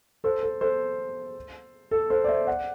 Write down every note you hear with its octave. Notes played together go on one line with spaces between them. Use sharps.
A4 C5
A4
A4 C5
A4
A4 C5
D5
C5 E5
D5 F#5